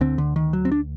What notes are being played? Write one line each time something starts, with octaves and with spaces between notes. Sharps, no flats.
D2 D3 C4
D3
D#3
F#3
C4
D4